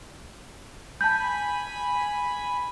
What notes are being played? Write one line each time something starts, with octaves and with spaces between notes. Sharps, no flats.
G#5 A5 B5 G6